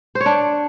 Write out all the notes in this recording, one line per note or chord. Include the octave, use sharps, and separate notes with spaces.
C5
C#5
D4